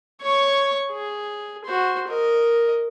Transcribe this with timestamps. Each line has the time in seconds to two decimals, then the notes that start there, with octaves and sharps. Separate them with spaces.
0.22 C#5 C#6
0.91 G#4
1.64 F#4 C5
2.08 A#4 D#5